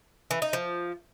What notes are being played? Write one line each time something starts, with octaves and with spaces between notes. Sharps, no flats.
E3
D#4
F3